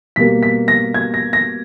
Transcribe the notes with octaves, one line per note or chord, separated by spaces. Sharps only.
B2 G3 A#3 B6
B6
A#6
G#6
A#6
A#6